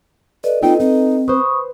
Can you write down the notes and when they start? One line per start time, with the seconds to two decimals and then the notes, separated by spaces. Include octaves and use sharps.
0.44 A4 B4 D5 D#5
0.62 C4 D#4 F4 A4 B4 D#5 G5
0.80 C4 D#4
1.28 B4 C5 B5 C#6 D#6